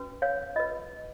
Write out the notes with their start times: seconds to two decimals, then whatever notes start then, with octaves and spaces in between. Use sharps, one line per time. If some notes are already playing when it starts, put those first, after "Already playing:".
Already playing: C#4 F#4 B4
0.22 C#5 F5
0.56 F4 D#5
0.60 B4